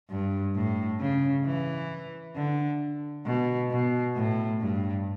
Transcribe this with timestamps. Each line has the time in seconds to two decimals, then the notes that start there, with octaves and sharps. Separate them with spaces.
0.10 G2
0.55 A2
1.00 C#3
1.45 E3
2.35 D3
3.26 B2
3.71 B2
4.16 A2
4.60 G2